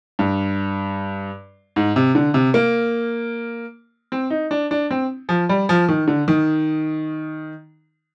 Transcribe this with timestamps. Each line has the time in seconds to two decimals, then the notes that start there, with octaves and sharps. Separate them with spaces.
0.19 G2
1.76 G#2
1.96 C3
2.15 D3
2.34 C3
2.54 A#3
4.12 C4
4.30 D#4
4.51 D4
4.71 D4
4.91 C4
5.29 F3
5.49 G3
5.69 F3
5.89 D#3
6.08 D3
6.28 D#3